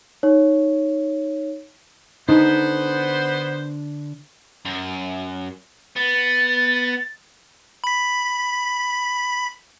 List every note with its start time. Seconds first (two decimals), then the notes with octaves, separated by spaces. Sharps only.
0.23 D#4 C#5
2.29 D3 B3 D4 D#4 A4 C5
4.65 F#2
5.97 B3 A6
7.84 B5 B6